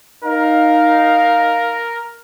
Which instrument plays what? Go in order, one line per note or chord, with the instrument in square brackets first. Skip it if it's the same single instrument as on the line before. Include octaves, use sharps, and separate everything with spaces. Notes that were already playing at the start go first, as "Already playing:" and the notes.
[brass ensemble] D#4 F5 [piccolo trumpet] A#4